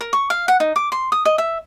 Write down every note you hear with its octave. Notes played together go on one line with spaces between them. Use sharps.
A#4
C#6
F5
F#5
D#4
D6
C6
D#6
D#5
E5